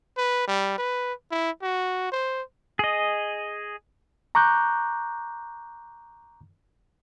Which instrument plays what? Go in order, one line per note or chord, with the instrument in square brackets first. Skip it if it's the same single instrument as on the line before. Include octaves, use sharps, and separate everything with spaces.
[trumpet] B4
G3
B4
E4
F#4
C5
[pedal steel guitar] G#4 D#5
[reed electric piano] A#5 C#6 D6 F#6 G6